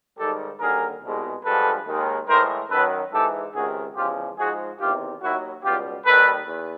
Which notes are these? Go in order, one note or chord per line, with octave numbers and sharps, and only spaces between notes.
G#2 D#3 G3 G4 A4
D#2 D3 G3 G#4 A#4
C2 B2 G#3
G2 D3 F3 G#3 A4 B4
D#2 D#3 G#3
A2 E3 G#3 A#4 C5
F#2 D#3 F#3 A4 B4
G#2 E3 G#3 G4 A4
C#2 C3 D#3 G#3 F#4 G#4
E2 C#3 F3 G#3 F4 G4
G#2 F3 G#3 F#4 G#4
E2 C3 D#3 F4 G4
D#2 D#3 F#3 E4 F#4
C#2 B2 G3 F4 G4
D#2 D#3 G3 A4 B4
E2